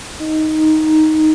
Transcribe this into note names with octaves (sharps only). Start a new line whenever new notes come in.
D#4